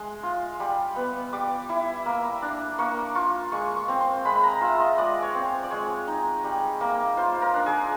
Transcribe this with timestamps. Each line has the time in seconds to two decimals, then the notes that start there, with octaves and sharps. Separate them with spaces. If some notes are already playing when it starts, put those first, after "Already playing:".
Already playing: G#3 C6
0.23 F4
0.60 G3
0.96 B3
1.33 G3 D6
1.69 E4
2.06 A#3
2.42 D4
2.79 A#3 C#6
3.15 F4 C#6
3.52 G#3 C#6
3.76 C#6
3.88 C4
4.01 C6
4.25 G#3 B5
4.35 B5
4.43 A#5
4.61 F4 E5
4.80 D#5
4.98 G#3 D5
5.22 C#5
5.35 C4
5.63 D5
5.71 G#3 C#5
6.07 D#4
6.44 G3
6.81 A#3
7.17 F4 C5
7.41 A#4
7.54 D4
7.66 G#4